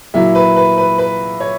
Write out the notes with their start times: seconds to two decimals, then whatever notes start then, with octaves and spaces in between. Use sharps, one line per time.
0.14 A#2 F#3 E4
0.35 B4
0.56 B4
0.78 B4
0.98 B4
1.40 C#5